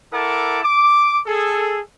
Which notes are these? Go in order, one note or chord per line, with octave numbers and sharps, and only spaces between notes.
E4 A4 A#4 F#5 A5 D6
D6
G#4 A4